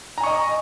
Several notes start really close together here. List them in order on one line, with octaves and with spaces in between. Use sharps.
A#5 G#5 C#6 D#5